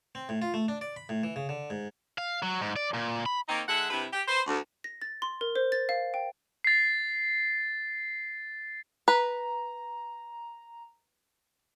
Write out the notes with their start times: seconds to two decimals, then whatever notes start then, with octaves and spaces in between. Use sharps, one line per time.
0.15 C4
0.29 A2
0.42 F4
0.54 A3
0.68 D4
0.81 D5
0.96 B5
1.09 A2
1.23 E3
1.36 C#3
1.49 D3
1.70 G#2
2.18 F5
2.42 F#3
2.61 G#2
2.76 D5
2.94 A#2
3.26 B5
3.48 D#3 A#3 C4 D#4
3.67 D3 G#3 E5 F#5
3.89 G2 C3 E4 B4
4.12 G4
4.27 B4 C5
4.47 D2
4.84 A#6
5.02 A6
5.22 C6
5.41 A#4
5.56 C5
5.72 A6
5.89 F5
6.14 G5
6.64 A6 C7
9.08 B4 A#5